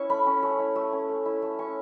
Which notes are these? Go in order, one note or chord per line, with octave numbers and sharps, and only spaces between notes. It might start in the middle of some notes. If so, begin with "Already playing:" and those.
Already playing: C#4 E4 C#6
A3 B5
C#4
A3
E4
A3
C#4
A3
E4
A3
C#4 C#6